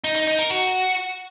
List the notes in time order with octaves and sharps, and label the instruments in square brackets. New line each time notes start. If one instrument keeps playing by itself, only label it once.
[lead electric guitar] D#4
D#4
D#4
A#4
F#4